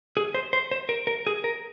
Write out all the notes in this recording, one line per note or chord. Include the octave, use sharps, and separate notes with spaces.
G#4
C5
C5
C5
A#4
A#4
G#4
A#4